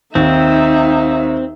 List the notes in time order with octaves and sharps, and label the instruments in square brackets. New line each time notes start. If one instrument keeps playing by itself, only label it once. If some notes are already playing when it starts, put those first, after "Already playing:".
[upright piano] D#2 [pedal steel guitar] C4 [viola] D#4 E5